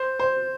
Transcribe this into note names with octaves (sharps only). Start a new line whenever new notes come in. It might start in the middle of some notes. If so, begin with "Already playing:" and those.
Already playing: C5
C5